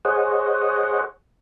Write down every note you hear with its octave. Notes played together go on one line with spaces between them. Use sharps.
G#4 C5 C#5 D#5 F#5